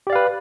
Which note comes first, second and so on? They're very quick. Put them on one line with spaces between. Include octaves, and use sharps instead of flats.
G4 D5 F5 B4